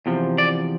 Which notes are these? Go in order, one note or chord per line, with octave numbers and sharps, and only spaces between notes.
E2 C3 F3
D5